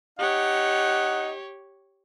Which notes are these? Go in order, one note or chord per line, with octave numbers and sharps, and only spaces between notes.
D#4 G4 C#5 F#5